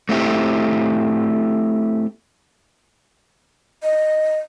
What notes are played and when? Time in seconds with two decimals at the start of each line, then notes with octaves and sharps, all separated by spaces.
0.09 A3 C4 E4 G4
3.83 D#5